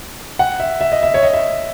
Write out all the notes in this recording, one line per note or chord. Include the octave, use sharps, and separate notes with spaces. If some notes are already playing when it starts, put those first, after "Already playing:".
F#5
E5
E5
D#5
E5
C#5
D#5
E5